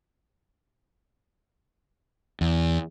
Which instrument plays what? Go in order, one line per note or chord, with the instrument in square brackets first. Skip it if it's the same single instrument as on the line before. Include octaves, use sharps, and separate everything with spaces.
[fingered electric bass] E2